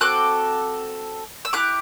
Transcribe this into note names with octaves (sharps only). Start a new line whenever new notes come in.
C4 F#4 A4 D6 F#6
E6
A3 E4 G4 D6 F#6